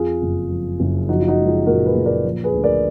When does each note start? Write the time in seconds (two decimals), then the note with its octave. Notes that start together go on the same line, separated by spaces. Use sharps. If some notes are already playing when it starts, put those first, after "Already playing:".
Already playing: F2 F4 G#4
0.22 F#1
0.51 F3
0.80 F#1
1.09 F3 D#4 F#4
1.20 F4
1.28 D#4 F#4
1.38 G#3
1.47 F4 G#4
1.66 A#2 F#4 A#4
1.86 G#4 B4
1.96 A#2
2.05 A#4 D5
2.25 F3
2.44 G#4 B4
2.54 D2
2.63 A#4 D5